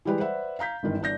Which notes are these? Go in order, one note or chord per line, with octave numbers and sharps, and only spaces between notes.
E3 G3 G#3 G4 G#4 B4
B4 C5 D5 E5 F#5
F5 A#5 G6 B6
G#1 G2 D#3 E3
G1 E3 D4 G6 A#6